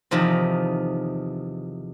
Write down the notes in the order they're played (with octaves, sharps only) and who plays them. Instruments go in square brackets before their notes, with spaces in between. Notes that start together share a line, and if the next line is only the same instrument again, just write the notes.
[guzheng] E2 C3 D#3 F3